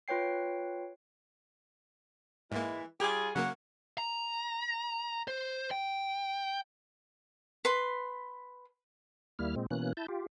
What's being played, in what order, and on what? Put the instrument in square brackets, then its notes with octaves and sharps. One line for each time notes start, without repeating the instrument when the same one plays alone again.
[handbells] F4 B4 C#5 G5 C7
[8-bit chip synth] G#2 A#3 [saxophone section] E3 G#3 E4
[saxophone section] G3 F4 G#4 [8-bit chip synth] G4 D6
[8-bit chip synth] C#3 F#3 A#3 [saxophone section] A#4 C#5 F#5
[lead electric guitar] A#5
C5
G5
[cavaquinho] B4 B5 C6
[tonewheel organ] D#2 G3 A#3 E4 F6
A#2 G#3 C4
B2 E3 A#3 C#4 F#6
E4 A5 G6
F4 G4